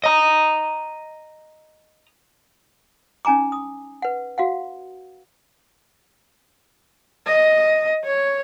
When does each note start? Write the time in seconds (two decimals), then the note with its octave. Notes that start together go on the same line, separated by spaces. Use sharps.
0.04 D#5 A#5
3.25 C#4 D#4 G#5 A#5 D6
3.52 D#6
4.02 B4 F#5
4.38 F#4 F5 F#5
7.26 D#5
8.04 C#5